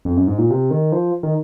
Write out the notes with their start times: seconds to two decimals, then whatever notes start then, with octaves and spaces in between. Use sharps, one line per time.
0.05 F2
0.17 F#2
0.27 G#2
0.38 A#2
0.51 C3
0.71 D#3
0.92 F3
1.23 D#3